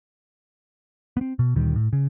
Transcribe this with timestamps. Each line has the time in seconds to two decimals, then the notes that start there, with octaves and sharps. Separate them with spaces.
1.17 B3 C4
1.39 B2
1.56 D2 A#2 D#3 G3
1.76 A2
1.93 C#3